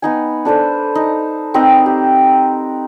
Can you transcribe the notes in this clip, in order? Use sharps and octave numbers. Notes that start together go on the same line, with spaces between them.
B3 D#4 G#5
D4 A4 B4 C5
D#4
C4 D#4 A#4 B4
G4